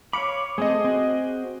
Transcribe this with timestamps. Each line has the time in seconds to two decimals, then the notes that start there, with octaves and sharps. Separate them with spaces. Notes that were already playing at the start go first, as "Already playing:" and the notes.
0.13 C#5 F5 B5 D6 C#7
0.58 A3 C4 G#4 A4 D#5
0.84 C4 F#4